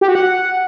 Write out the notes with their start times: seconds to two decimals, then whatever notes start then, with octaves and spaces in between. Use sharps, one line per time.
0.01 G4
0.08 F#4
0.15 F#5